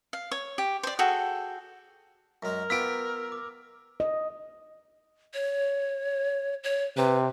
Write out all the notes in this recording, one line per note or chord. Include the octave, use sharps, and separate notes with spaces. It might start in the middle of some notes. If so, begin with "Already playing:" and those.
F5
C#5
G4
C5 D5
F#4 G#4 A4 G5
F#2 G#3 A#4
B3 F4 G4 E6 B6 D7
D6
D#5
C#5
C#5
C3 B4